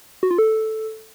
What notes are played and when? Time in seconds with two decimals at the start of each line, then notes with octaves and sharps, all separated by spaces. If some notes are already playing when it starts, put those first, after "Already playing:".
0.23 F#4
0.31 F4
0.38 A4